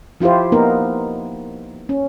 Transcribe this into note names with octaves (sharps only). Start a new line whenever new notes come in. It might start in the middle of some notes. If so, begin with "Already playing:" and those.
F3 E4 F4 G4 C5
A#3 B3 D#4 A#4
C#4